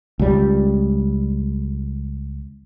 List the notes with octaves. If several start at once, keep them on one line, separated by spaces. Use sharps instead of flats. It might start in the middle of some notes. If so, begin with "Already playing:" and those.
C#2 G3